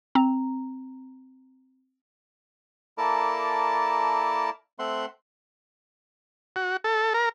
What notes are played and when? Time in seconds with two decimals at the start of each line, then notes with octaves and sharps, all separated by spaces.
0.15 C4 A#5
2.98 A#3 E4 A4 A#4 D5 A5
4.79 A3 C4 E5 F#5 C6
6.56 F#4
6.84 A4
7.14 A#4